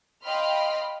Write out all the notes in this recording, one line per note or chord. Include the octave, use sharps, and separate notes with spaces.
D#5 F5 G5 B5 C6 F6